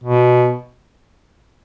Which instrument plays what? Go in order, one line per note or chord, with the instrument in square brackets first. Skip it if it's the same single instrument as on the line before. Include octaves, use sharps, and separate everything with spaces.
[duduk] B2